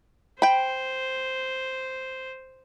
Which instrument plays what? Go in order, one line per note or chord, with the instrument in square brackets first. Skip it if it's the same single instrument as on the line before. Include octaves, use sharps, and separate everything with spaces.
[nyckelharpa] C5 [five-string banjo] G5 B5